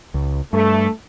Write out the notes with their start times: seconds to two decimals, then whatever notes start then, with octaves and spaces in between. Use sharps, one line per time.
0.14 C#2
0.53 G2 A3